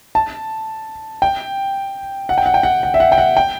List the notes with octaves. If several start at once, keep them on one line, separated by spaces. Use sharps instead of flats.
A5
G5
F#5
G5
F#5
G5
F#5
F#5
E5
F#5
G5
F#5
G5